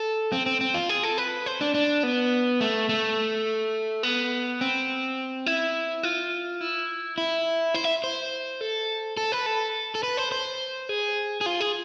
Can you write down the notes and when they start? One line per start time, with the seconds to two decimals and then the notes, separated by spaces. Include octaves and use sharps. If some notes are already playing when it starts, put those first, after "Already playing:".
Already playing: A4
0.32 C4
0.46 C4
0.61 C4
0.74 F4
0.89 G#4
1.03 A4
1.18 B4
1.46 C5
1.61 D4
1.74 D4
2.03 B3
2.61 A3
2.89 A3
4.03 B3
4.61 C4
5.46 E4
6.03 F4
6.61 E4
7.18 E4
7.74 C5
7.84 E5
8.04 C5
8.61 A4
9.17 A4
9.32 B4
9.46 A4
9.95 A4
10.03 B4
10.17 C5
10.32 C5
10.89 G#4
11.41 G#4
11.46 F4
11.60 G#4